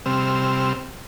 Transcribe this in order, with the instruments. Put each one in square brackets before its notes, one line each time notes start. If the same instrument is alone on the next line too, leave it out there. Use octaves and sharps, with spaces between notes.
[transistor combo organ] C3 G3 C4 E6 F6